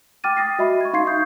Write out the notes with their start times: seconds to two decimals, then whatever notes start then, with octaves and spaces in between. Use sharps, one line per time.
0.24 G5 D6 F6 A6 D#7
0.37 D#6 A6 A#6 C7
0.59 F#4 D#5 E5 B5
0.81 C#6 G#6
0.93 D#4 F5 C6 G#6 C7
1.07 C#6 D#6 G6